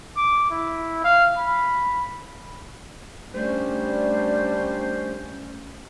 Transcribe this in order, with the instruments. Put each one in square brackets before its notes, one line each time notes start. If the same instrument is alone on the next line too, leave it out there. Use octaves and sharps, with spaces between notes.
[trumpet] D6
E4
F5
B5
[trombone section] G3 D4 [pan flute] A3 [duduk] C#4 [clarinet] C5